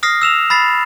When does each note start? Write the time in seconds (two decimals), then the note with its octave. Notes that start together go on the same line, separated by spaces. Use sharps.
0.03 D#6 F6 A#6 C7
0.22 E6 E7 F7
0.50 B5 A6 C7